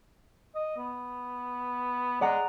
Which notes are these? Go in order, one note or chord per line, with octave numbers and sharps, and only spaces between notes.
D#5
B3
G#3 D5 F#5 A#5